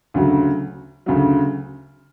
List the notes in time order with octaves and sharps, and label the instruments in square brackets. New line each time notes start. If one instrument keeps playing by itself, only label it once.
[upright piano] D2 C#3 F#3
D2 C#3 F#3